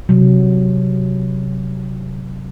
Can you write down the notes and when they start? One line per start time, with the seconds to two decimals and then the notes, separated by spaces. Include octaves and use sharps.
0.09 C3 F#3